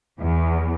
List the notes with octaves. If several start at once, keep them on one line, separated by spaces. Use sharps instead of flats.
E2